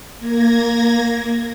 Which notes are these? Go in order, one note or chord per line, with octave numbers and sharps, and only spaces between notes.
A#3 G#6 A#6